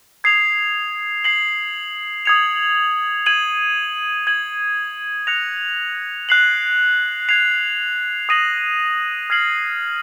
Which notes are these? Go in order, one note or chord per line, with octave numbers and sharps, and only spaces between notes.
D#6 G#6 C7 F7
G#6 C7 F#7
D#6 G#6 C#7 F7
G#6 D#7 F#7
G#6 D#7 F#7
F#6 A#6 C#7 F7
F#6 C7 F#7
G#6 C7 F7
D#6 A#6 D#7 F#7
F6 G#6 C7 F#7